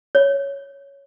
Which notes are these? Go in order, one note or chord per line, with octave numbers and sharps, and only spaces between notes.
C#5